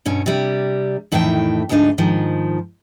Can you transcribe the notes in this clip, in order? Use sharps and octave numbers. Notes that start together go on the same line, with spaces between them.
G2 B2 C#4
C3 G3
F2 A2 D#3 E3 B4 G5
D2 G#2 F3 D4 D#4
G#2 D#3 F3